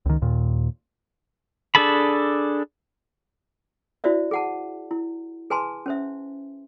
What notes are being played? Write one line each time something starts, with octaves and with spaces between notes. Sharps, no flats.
C#2 D#3
D#2 A#2
D4 G#4 A4 A5 B5
E4 F#4 C5 D5 E5
G#4 F#5 A5
E4
G#4 B4 G#5 A5 C6
C#4 C5 E5